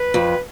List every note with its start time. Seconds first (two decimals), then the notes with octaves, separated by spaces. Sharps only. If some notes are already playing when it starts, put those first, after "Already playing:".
Already playing: B4
0.14 F2